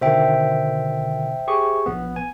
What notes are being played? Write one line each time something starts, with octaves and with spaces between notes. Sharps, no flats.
B2 D3 D#3 C5 E5 G5
G4 G#4 C#6
A#1 B3
G#5